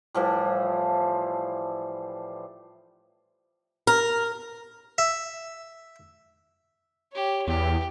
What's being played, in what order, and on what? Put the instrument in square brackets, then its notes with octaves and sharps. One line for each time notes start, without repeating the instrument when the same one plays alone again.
[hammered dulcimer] A2 E3 F3 G3
[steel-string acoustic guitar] A#4
[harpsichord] E5
[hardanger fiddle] G4 C#5
[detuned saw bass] E2 [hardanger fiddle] G4